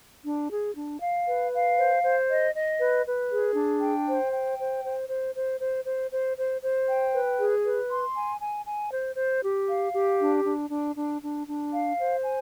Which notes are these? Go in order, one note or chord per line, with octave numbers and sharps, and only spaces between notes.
D4
G#4
D4
F5
B4
F5
C5
C5
D#5
D#5
B4
B4
G#4
D4
G5
C5
G5
C5
C5
C5
C5
C5
C5
C5
C5
C5
G5
B4
G#4
B4
C6
G#5
G#5
G#5
C5
C5
G4
F5
G4
D4
D4
D4
D4
D4
D4
F5
C5
G#5